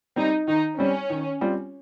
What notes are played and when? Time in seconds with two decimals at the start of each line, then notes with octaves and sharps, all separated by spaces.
0.16 G3 C4 D#4
0.47 D#3 D#4
0.78 G3 C4 C#4
1.10 D#3
1.41 G3 C4 F4